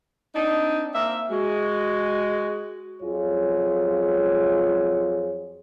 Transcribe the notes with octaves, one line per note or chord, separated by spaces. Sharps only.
C4 D4 D#4
A#3 C4 E5
G#3 F#4
F2 F#3 F4 G#4 C#5